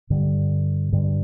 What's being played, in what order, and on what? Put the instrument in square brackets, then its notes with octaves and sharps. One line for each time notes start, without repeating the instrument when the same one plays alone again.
[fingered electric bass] G2 D3 G3
G2 D3 G3